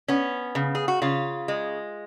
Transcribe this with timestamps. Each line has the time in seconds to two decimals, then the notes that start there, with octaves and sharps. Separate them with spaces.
0.08 B3 C#4
0.55 C#3
0.75 G#4
0.88 F#4
1.02 C#3 F4
1.48 G#3